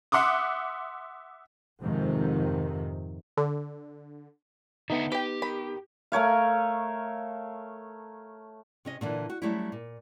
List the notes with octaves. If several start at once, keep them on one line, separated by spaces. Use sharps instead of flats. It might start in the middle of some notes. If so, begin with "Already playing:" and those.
E5 F#5 C6 D6 D#6
F2 G#2 C3 D#3
D3
D3 B3 D#4 E5 F#5
G4 B4 G5
D#3 B5
A3 A#4 C#5 F5
C3 C#4 D#5
A#2 D3 E3
F#4
F#3 G3 A3 C#4 E4
A#2